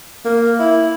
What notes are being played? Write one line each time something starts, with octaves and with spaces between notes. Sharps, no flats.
A#3
E4